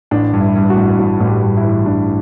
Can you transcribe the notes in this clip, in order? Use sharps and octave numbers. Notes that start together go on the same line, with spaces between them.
A1 D4
G2
E4
G2
F#4
A1
A1 F#4
A1
G4
G2
E4
E3
A1 D4